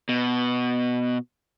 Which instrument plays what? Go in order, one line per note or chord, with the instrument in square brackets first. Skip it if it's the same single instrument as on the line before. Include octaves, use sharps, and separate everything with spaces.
[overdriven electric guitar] B2